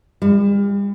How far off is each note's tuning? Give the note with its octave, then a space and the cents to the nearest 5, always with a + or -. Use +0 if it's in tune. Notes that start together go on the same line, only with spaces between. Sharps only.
G3 +40